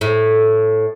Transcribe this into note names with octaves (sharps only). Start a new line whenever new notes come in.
A2